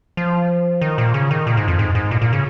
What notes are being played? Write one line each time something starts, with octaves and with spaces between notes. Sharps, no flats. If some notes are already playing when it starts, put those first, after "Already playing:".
F3
D#3
A#2
C#3
D#3
A#2
G#2
F2
G#2
G#2
A#2
A#2
C#3